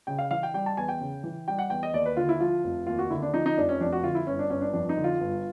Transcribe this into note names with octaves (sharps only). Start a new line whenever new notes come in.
C#3 G5
F5
E3 F5
G5
G3 G5
A5
E2 G#5
G5
C#3
E3
G3 G5
F#5
E2 G5
D#5
D#2 D5
B4
D3 F4
E4
F3 F4
F1
D#2 F4
F#4
D3 E4
D4
F3 D#4
D#4
F1 D4
C#4
F2 D4
F#4
D3 F4
E4
G1 C#4
D4
G1 C#4
D4
F2 D4
D#4
D3
F4
G1